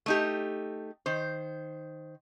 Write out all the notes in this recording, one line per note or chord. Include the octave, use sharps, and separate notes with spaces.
A3 D#4 G4
D#3 C5